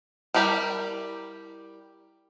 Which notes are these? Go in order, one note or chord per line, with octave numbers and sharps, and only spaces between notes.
G3 E4 G4 A#4 D5